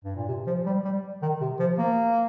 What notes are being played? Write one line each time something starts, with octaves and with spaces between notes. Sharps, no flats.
G2
A#2
C3
F3
G3
G3
D#3
C3
F3
A#3